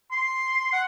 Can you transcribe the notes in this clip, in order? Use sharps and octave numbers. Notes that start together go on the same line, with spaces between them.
C6
F#5